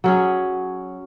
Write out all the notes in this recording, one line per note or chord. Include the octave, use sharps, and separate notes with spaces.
F#3 C#4 G#4